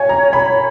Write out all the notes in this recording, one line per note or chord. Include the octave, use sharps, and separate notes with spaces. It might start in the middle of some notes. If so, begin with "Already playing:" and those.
Already playing: C#5 F5 G#5
A#5
B5